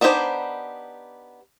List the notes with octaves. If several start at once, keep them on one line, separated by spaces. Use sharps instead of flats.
B3 D4 D#4 G4 C5